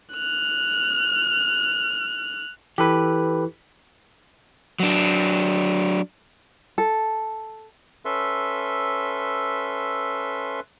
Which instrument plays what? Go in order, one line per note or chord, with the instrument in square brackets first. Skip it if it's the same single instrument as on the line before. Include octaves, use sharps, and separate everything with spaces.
[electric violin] F6 F#6
[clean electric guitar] E3 [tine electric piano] G4 A4 B4
[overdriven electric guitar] F#3 D4
[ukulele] A4
[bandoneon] C#4 A4 B4 E5 C6